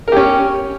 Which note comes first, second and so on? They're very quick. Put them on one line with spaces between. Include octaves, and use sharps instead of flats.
A#4 G4 C#4